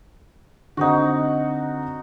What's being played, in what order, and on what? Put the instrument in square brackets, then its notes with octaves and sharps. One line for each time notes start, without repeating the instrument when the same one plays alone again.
[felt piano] D3 C4 F#5 [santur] D#4 F#4